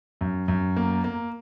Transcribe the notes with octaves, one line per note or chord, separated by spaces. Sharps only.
F#2
F#2
A#3
A#3